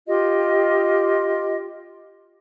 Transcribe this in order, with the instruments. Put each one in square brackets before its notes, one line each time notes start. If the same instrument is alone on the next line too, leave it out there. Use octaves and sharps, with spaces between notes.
[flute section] F4 G4 D#5